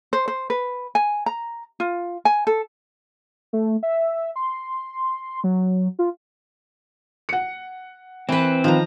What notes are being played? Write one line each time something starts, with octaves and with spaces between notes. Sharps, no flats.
C5
C5
B4
G#5
A#5
F4
G#5
A4
A3
E5
C6
F#3
F4
F#5 C#7
E3 C4 B4
D#3 F3 F4 A#5